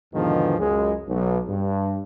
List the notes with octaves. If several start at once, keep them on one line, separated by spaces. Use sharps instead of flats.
E2 G#2 B2 D3 D#3 F3
C#2 F#2 G#3
B1
G2